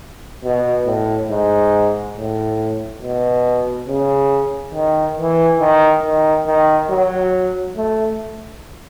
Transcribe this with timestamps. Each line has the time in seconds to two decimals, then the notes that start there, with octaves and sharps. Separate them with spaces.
0.44 B2
0.86 A2
1.30 G#2
2.16 A2
3.02 B2
3.88 C#3
4.74 D#3
5.17 E3
5.60 D#3
6.03 D#3
6.46 D#3
6.90 F#3
7.77 A3